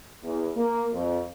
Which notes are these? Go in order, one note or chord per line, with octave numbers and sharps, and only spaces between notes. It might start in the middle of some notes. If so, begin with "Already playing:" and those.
E2
A#3
F2